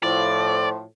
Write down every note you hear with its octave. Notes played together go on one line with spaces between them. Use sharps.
A2 F3 D5